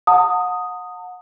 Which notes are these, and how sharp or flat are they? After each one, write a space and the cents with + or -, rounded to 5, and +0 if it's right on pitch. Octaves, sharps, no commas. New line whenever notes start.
F#5 -30 A5 +40 D#6 +0